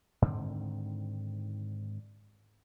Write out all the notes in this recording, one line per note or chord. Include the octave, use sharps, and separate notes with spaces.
G#2 D3 D#3 C4